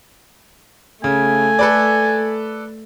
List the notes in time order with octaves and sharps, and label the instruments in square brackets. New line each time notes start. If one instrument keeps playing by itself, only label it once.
[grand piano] C#3 [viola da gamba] A3 [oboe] G#5
[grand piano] A4 B4 D5